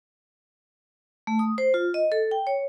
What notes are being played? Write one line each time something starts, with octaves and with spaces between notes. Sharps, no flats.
A3
D#6
C5
F4
D#5
A4
G5
C#5